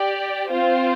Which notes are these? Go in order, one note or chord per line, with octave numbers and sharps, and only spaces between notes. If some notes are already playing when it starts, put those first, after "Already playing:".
Already playing: G4 D5 G5
C4 F4 C5